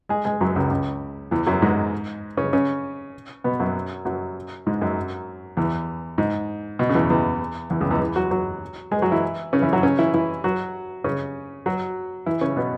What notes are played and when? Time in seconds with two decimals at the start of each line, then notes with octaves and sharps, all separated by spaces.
0.09 G#3 G#4
0.25 G#3 G#4
0.41 F#2 F#3
0.56 C#2 C#3
0.70 C#2 C#3
1.31 E2 E3
1.47 F#2 F#3
1.62 G#2 G#3
2.37 C#3 C#4
2.53 C#3 C#4
3.44 B2 B3
3.60 F#2 F#3
4.05 F#2 F#3
4.67 G#2 G#3
4.81 F#2 F#3
5.57 E2 E3
6.18 G#2
6.79 B2
6.89 C#3
6.94 E2 E3
7.10 E2 E3
7.70 E2 E3
7.81 C#2 C#3
7.90 E2 E3
8.01 E2 E3
8.16 F#3 F#4
8.31 F#3 F#4
8.92 G#3 G#4
9.02 F#3 F#4
9.12 E3 E4
9.53 C#3 C#4
9.63 E3 E4
9.73 F#3 F#4
9.83 C#3 C#4
9.99 E3 E4
10.14 E3 E4
10.44 F#3 F#4
11.04 C#3 C#4
11.66 F#3 F#4
12.26 E3 E4
12.41 C#3 C#4
12.57 B2 B3